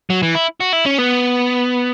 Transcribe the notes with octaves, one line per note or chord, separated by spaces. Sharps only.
F#3
E3
E4
F#4
E4
C#4
B3